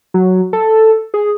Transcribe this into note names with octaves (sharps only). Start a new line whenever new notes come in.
F#3
A4
G#4